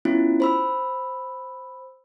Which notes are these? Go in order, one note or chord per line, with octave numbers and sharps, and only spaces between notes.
B3 C#4 E4 F4
C5 B5 E6